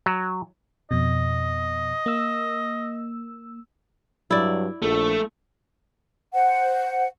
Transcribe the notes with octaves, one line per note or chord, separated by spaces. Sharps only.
F#3
F2 B2 D#5
A#3 E6
G2 F#3 E4 D5
A#1 A3
C5 F#5